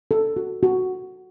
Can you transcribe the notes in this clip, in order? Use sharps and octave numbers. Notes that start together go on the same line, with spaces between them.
A4
F#4
F#4